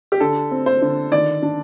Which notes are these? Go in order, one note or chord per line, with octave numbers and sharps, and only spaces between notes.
G4
D3 A4
C4
C5
D3
D#3 D5
D4